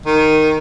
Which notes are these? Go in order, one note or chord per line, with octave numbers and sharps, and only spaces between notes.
D#3